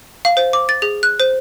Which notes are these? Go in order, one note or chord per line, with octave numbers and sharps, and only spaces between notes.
F5
C5
D6
A6
G#4
F#6
C5